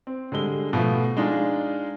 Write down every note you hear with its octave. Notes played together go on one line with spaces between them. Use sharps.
C4
D3 G3 G#3 G7
B2 F3 A3
G#3 D4 D#4 F4 G#4